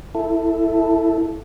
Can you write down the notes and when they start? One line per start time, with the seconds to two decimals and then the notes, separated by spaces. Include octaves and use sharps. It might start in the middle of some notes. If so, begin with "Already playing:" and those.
0.15 E4 A4